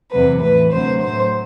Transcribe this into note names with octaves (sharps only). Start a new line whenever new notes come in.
E2 C3 F#3 B4
A2 E3 B4
D2 C3 F#3 C5
A2 F#3 C5